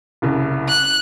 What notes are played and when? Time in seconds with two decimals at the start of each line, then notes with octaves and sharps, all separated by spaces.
0.22 F#1 C2 C#3
0.69 F#6